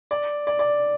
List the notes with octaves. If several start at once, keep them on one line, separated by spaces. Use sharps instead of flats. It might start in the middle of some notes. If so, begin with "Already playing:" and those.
D5
D5
D5